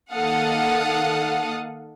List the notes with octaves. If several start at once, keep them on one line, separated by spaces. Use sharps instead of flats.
D#3 A#3 A4 F5 F#5 D#6